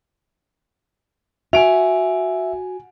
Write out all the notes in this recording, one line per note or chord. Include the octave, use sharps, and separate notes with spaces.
F#4 E5 G#5 D7 F7